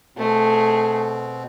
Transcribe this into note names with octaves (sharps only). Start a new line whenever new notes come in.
B2 A3 C4 G#4